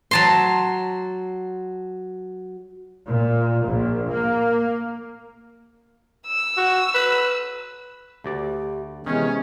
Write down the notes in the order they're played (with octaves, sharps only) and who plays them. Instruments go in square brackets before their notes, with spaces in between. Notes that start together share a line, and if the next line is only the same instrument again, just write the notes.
[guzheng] F#3 A5 C6
[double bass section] A#2
A#1
A#3
[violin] E6
[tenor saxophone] F#4
B4
[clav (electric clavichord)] D2 D5 [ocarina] G4
[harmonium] C3 E3 G#3 [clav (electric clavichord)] D#3 [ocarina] B3 [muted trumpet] C#4